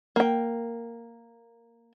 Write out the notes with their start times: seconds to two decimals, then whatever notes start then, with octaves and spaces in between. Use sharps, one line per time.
0.16 A#3 G5